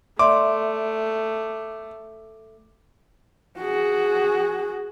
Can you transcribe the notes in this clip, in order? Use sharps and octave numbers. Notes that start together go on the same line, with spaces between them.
A3 D5 E5 C6 D6
F#4 G#4